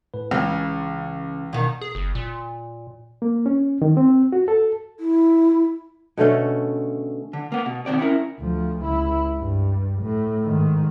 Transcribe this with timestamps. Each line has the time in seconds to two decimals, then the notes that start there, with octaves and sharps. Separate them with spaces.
0.14 A2 B4
0.31 C#2 C#3 E3
1.53 B2 D#3
1.81 G#4
1.95 F#1
2.15 A#2
3.22 A#3
3.46 C#4
3.82 D#3
3.97 C4
4.32 F#4
4.48 A4
5.00 E4
6.17 B2 D3 A3 C#4
7.33 D3
7.52 A#3 B3
7.66 B2
7.86 B2 D#3 C4 D5
7.99 C#4 E4 A#4
8.40 D2 F3
8.83 C#2 E4
9.38 G2
10.02 A2
10.45 G#2 D#3